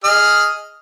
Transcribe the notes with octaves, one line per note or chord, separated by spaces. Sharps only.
G#4 D#5 F6